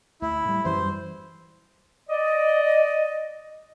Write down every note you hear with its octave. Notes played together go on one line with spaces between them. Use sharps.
D2 E4
A2 G3
F#2 E3 G3 C5
D5 D#5